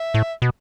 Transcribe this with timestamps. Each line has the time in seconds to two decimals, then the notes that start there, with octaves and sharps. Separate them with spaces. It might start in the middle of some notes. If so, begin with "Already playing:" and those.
Already playing: E5
0.14 A2
0.42 B2